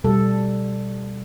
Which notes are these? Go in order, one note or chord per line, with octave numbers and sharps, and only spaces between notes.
B2 G3 A4